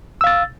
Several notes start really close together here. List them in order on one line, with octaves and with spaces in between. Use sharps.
E6 F5 A6